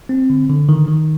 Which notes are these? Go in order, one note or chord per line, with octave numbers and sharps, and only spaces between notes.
C4
D3
D3
D#3
D#3